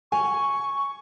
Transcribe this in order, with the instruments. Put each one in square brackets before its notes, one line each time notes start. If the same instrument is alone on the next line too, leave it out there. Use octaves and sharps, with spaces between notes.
[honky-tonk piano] G#5 [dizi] C#6